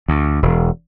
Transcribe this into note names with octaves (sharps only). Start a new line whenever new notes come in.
D2
E1